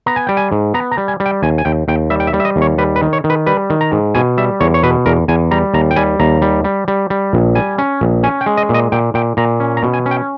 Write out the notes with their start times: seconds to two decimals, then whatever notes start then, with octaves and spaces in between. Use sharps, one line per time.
0.06 B3 A#5
0.16 G#5
0.27 G3 G5
0.37 G#5
0.52 G#2
0.74 B3 A#5
0.91 A#5
0.98 G3
1.08 G#5
1.20 G3
1.26 G5
1.42 D#2 G#5
1.58 G#5
1.65 D#2 G5
1.88 D#2 G5
2.10 G3 E5
2.20 G5
2.27 E5
2.33 G3
2.40 E5
2.45 D#5
2.56 D#2
2.62 C#5
2.78 G3 B4
2.96 B4
3.02 D#3
3.13 C#5
3.24 D#3
3.30 B4
3.46 G3 B4
3.70 D#3
3.81 A#5
3.92 G#2
4.15 B2 G#5
4.38 G3 E5
4.60 E2 C#5
4.74 C#5
4.83 B2 B4
5.06 E2 A#4
5.28 E2 G#5
5.51 G3 A#5
5.74 D#2 A#5
5.91 G5
5.96 G3 G#5
6.20 D#2 A#5
6.42 G3
6.64 G3
6.88 G3
7.10 G3
7.33 A#1
7.55 G3 G#5
7.78 C#4
8.01 A#1
8.23 C#4 G#5
8.41 G5
8.46 G#3
8.57 D#5
8.69 A#2
8.74 D#5
8.92 A#2 G5
9.14 A#2 G5
9.37 A#2 A#5
9.60 C#4
9.77 A#5
9.83 B2
9.94 G#5
10.06 C#4
10.11 G5